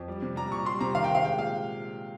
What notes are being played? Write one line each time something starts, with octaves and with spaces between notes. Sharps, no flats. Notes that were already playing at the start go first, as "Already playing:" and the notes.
Already playing: F2
G3
C3
G3 A#5
A#2 C#6
G3 C6
C3 A#5
D#3 F5
G5
C3
F5
G#3 G5
A#2 F5